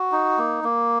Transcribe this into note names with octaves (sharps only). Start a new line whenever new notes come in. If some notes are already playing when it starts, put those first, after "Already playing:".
Already playing: F#4
D#4
A#3
A#3